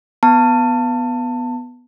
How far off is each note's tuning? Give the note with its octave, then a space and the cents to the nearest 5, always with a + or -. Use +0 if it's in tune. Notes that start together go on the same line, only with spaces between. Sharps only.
B3 +0 A5 +25